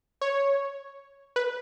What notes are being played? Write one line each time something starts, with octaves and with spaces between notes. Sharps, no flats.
C#5
B4